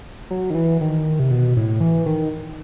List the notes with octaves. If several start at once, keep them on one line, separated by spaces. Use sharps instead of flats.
F#3
D#3
E3
D#3
C3
B2
A2
E3
D#3